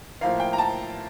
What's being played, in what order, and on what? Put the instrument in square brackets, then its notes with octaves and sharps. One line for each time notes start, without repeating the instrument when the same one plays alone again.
[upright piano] A2 F3 A#3 F5
G5
A#5
A5